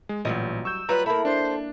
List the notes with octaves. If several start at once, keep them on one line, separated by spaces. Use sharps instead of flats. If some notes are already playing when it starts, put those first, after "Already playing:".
G#3
A1 A#2 F#3 G3 D#5
C#6 E6 G6
F#3 G3 F4 B4 A#5
A#3 E4 A4 B5
D4 C5